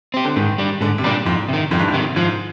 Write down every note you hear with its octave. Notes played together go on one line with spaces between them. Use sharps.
C4 G4
D3
G#2 D#3
G3 D4
G#2 D3
C3
A#2 G3 D4
F2 G#2
C3 D#3
F2 G#2
G2
G#2
C3 D#3
G#2 F3